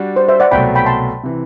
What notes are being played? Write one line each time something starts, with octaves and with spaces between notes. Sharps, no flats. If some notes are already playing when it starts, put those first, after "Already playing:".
Already playing: G3 D4 F#4
C5
C5 E5
D5 F#5
C2 B2 F#3 A3 G5 B5
G5 B5
A5 C6
C3 E3